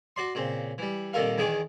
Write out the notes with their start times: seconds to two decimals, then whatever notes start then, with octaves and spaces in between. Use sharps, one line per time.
0.16 F#4 D5 C6
0.35 A#2 C#3 C4
0.78 E3 G3
1.13 C2 A#2 D#3 A4 A#4 F5
1.38 E2 D#3 E3 G#4 G5 D6